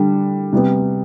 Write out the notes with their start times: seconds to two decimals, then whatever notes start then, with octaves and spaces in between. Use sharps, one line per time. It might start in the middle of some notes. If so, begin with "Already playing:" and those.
Already playing: D3 G3 D4
0.53 C3 G3 B3